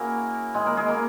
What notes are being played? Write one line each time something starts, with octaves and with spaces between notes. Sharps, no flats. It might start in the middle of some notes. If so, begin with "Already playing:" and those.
Already playing: A#3 C#4 E4 F#4 G#4 A#4
G#3 G#4
A#3 A#4
G#3 G#4
A#3 A#4